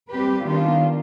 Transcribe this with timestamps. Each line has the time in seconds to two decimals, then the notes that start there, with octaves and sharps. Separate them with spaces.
0.12 G3 C4 G4 B4
0.46 D#3 B3 D4 F4